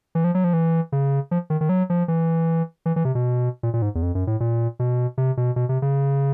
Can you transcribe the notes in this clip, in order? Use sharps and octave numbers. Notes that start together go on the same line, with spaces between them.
E3
F3
F#3
F3
E3
C#3
F3
D#3
D#3
F#3
F3
E3
E3
E3
C3
B2
A#2
A#2
G#2
E2
F2
F#2
A2
A#2
B2
C3
B2
B2
C3
C#3